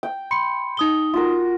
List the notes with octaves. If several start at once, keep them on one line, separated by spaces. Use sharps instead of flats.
G5
B5 C6 C#7
D#4 D#6 G7
F4 F#4 A#4